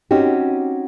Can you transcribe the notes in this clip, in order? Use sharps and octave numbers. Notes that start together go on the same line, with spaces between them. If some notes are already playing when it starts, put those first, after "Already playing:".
C4 C#4 D#4 F#4 G4